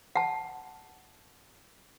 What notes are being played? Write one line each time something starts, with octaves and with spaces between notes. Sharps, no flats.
F#5 A5